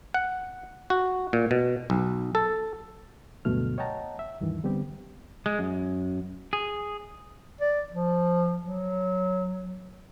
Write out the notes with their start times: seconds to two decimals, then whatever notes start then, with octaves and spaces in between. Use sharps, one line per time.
0.14 F#5
0.90 F#4
1.33 A#2
1.51 B2
1.90 B1
2.35 A4
3.45 D2 G2 B2 F#3 A3 F6
3.78 C#5 D#5 F#5 G5 A5 A#5
4.19 E5
4.40 D2 G2 D#3 E3
4.64 D3 G3 B3 C4 G4
5.46 G#3
5.59 F#2
6.53 G#4
7.61 D5
7.91 F3
8.63 F#3